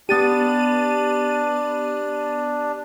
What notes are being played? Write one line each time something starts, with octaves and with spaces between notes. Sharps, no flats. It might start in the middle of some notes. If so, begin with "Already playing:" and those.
B3 D4 G4 A6 D#7